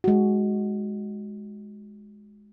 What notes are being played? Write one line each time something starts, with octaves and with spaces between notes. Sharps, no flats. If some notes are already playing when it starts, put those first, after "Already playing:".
G#3 F#4